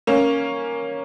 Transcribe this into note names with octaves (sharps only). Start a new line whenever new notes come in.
A#3 C#4